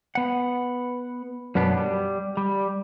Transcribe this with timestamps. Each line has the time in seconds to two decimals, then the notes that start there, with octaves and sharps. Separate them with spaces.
0.15 B3 F#5
1.55 F#2 B2 B3 D4
1.77 G3
2.37 G3